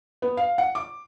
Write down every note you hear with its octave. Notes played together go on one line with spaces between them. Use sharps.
B3
F5
F#5
D6